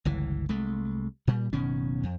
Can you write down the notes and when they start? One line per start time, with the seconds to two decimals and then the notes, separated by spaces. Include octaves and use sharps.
0.05 G1 C#2 E3
0.49 C2 G#3 A3
1.27 A#2 G3
1.53 F#1 B2 D#3 C#4
2.03 F2